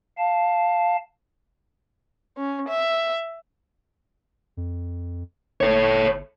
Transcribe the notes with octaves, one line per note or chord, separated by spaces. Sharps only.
F5 A5
C#4
E5
F2
G1 A4 C#5